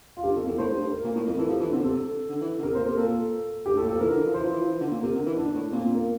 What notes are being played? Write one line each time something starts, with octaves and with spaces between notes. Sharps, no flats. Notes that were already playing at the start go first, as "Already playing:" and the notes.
F4
G2 G4
F2 A4
E2 A#4
A2 C5
G2
G2
A#4
A#2
A2
F2 A#4
E3 A4
F3 G4
E3 D4
D3 C4
C3 A4
D3
E3
D3
C3 A#4
A#2 C5
C3 A#4
A#2 A4
G2 G4
A2 A4
A#2
F3 A4
E3 A#4
D3
E3
F3
E3 C5
F3
E3
F3
E3
D3
A#2
C3 A#4
D3
E3
D3 D4
A2
A#2 C4
A#3